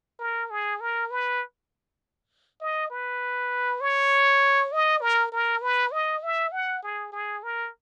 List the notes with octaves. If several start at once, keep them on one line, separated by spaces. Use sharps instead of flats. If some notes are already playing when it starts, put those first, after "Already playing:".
A#4
G#4
A#4
B4
D#5
B4
C#5
D#5
A#4
A#4
B4
D#5
E5
F#5
G#4
G#4
A#4